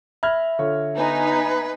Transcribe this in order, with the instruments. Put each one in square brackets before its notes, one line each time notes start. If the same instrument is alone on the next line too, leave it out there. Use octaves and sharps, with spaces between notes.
[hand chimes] E5 [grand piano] B5 F6 G#6
[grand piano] D3 F4 C#5
[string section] B3 D#4 G#5 [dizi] B4